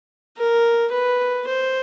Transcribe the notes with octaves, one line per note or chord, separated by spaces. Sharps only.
A#4
B4
C5